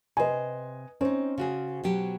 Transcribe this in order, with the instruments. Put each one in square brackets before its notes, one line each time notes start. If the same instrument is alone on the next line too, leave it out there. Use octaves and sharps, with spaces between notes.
[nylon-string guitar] C3 C5 [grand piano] B4 D#5 G#5
[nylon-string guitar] C4 D#4 [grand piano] C#4 C5
[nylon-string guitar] C#3 F#4 G#4
B2 F#3 G4